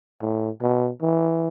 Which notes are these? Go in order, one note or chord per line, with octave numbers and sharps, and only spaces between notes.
A2
B2
E3